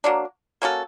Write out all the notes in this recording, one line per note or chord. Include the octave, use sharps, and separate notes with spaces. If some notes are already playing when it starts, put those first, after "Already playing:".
F#3 A#3 D4
A#3 C#4 F#4 A4